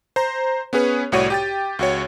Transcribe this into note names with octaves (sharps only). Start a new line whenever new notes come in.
C5 A#5
B3 C#4 G#4 B4 C#5
C2 A2 F#4 C#5 D5 D#7
G4 G5 A6
C#2 F#4 C#5